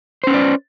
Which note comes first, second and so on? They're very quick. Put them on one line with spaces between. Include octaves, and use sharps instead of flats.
C5 C#4 B4 D5